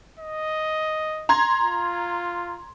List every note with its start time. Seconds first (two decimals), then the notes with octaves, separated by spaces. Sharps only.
0.19 D#5
1.29 A#5 C6 G#6
1.61 F4